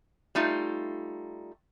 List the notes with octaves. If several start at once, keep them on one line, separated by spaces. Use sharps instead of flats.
G3 A3 D#4 F4